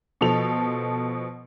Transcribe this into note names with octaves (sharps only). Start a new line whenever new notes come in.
B2 F3 A4 F7